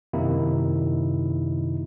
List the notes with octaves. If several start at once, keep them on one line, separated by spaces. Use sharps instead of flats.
F#2 C3 D#3 A#3 D#4 E4